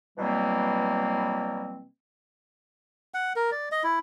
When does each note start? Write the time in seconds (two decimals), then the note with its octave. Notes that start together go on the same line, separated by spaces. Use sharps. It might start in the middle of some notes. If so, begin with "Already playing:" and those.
0.18 B2 E3 F#3 G3 A#3 C4
3.14 F#5
3.36 A#4
3.52 D5
3.72 D#5
3.84 E4